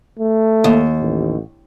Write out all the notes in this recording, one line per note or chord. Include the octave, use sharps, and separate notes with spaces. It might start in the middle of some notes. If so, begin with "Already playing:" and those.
A3
D#2
A1